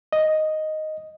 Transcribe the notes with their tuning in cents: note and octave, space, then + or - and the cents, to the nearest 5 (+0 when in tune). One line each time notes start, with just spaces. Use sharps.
D#5 +0